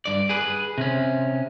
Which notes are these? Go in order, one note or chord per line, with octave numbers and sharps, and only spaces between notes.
G2 D5
G#4 B4
C3 C#4